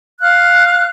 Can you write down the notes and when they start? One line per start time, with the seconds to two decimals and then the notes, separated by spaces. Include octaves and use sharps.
0.20 F5 F6 F#6